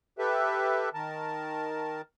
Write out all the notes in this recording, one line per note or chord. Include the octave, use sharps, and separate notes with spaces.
G4 A4 B4 E5
D#3 A#4 A5